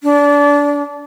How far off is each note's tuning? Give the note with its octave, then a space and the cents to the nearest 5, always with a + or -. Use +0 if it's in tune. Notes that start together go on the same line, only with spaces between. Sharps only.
D4 -25